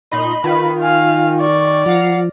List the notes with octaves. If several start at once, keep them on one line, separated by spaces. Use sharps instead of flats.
A#2 D#4 D#5 B5 C6
D#3 F4 B4
F5 G#5
D5 C#6
F3 F5 F#5 A#5